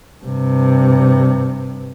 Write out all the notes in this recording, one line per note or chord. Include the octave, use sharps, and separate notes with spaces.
G2 C3